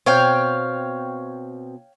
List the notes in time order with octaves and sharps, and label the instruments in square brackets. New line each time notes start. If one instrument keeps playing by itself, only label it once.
[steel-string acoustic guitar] B2 C4 [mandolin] C#5 F5 G5